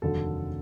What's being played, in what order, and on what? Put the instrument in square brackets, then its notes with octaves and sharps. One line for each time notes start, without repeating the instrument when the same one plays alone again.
[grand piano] F1 D#2 D3 F#3 A4